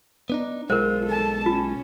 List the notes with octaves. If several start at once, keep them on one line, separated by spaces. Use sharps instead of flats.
B3 D4 D#4
B1 G#3 F4 A#4 C5
A4 A5
C#4 F4